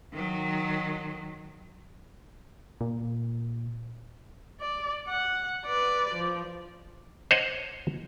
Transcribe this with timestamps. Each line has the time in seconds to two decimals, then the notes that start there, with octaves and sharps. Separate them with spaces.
0.13 D#3 F#3
2.81 A#2
4.61 D5
5.08 F#5
5.66 B4 D5
6.15 F3
7.31 C5 C#5 D#5 F#5